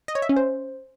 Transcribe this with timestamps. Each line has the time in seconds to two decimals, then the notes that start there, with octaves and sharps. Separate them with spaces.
0.08 D#5
0.15 C#5
0.22 E5
0.29 C#4
0.36 C5